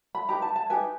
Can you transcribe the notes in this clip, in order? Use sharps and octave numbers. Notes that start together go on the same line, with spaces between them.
B5
D#4 G4 B4 A#5
A5
A5
D#4 G4 B4 G#5